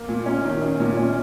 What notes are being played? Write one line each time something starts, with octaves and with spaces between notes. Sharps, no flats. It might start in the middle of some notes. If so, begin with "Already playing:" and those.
Already playing: A#3
A#2
C#4
D#3
C#4
A#2
C#4